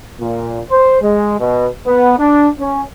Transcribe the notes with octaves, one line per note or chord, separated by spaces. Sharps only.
A#2
C5
G#3
B2
B3
D4
C#4